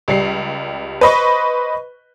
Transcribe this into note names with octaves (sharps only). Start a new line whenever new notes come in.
C#2 G3 C7
B4 C5 D#5 B5 C#6